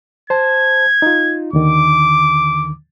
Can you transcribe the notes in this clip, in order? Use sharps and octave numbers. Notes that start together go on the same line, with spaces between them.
C5 A5 G#6
D#4 F4
D#2 D3 D#3 D6